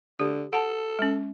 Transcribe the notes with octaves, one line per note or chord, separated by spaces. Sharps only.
D3 G4
A4 F#5 A5
G#3 C#4